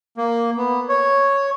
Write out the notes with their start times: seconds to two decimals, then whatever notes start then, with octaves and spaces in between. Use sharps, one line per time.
0.17 A#3
0.57 B3
0.89 C#5